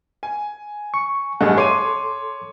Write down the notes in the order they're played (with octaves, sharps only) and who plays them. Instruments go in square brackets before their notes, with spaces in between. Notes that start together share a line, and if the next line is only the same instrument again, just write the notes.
[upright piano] G#5
[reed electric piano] C#6
[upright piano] A1 G2 A3 [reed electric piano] G#4 D#5 F#5
[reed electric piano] A4 C6 D6 [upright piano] C#5 D#7